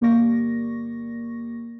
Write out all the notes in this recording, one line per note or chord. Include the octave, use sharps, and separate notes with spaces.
G1 A#3 G4 D5 C#6 A#6